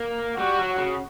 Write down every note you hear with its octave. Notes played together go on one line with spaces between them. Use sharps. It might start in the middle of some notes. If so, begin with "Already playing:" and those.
Already playing: A#3
G3 F#4
F#3
C#3